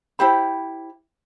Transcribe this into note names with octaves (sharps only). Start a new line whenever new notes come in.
E4 G4 C5 B5